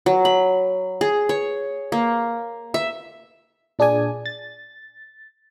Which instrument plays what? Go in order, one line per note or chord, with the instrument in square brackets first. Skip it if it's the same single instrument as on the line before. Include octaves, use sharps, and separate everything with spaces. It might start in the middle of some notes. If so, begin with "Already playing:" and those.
[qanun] F#3
B5
G#4
C#5
A#3
E5
[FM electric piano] A#2 D4 G#4 D5 G#5
A6